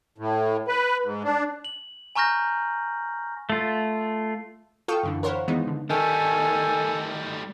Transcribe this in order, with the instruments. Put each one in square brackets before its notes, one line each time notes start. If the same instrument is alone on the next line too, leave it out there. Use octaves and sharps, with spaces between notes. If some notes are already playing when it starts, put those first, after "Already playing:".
[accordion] A2
B4
G#2
D4
[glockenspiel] F#7
G#5 A#5 C#6 F6 G6 A#6
[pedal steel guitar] A3 F4
[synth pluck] F4 A4 F5 G5 C#6 D#6
F#2 D3 E3
A#4 C5 C#5 F5 F#5 B5
D#3 E3 G#3 B3 D#4
D3
[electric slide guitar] D#3 [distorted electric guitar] G3 A3 [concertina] A4 [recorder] G#5